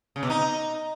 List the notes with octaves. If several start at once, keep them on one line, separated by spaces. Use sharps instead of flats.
C#3
B2
D#4